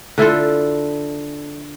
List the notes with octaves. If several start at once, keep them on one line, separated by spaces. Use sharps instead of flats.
D3 E4 F4 A4